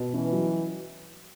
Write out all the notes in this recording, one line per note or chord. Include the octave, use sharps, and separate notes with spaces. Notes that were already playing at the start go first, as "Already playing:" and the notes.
Already playing: B2
E3 C#4
F#3